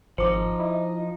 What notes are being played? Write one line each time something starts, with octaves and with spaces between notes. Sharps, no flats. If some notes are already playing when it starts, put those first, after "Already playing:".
G#1 F3 D#4 C5 D6
E4 D#5